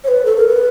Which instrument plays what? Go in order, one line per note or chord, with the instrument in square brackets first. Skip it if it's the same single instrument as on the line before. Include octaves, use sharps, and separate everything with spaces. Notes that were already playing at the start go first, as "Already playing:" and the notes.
[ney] C#5
B4
A4
A#4
B4